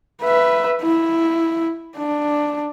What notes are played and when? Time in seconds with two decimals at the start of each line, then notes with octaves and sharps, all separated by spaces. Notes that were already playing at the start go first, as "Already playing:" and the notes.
0.22 B4 E5
0.82 E4
1.97 D4